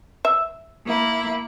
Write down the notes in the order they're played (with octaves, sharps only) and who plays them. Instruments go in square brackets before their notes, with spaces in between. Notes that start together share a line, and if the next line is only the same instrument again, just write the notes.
[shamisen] E5
[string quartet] A#3 E4